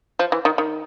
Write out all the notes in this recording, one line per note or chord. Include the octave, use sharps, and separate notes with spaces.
F3
E3
D#3
D#3